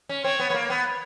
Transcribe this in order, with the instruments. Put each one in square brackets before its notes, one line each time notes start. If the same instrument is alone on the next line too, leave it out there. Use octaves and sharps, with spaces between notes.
[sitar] C#4
[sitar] C4 [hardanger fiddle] C#5
[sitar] B3
B3
A#3
B3